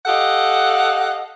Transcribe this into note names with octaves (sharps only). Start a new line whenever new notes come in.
G4 A4 D#5 F5 F#5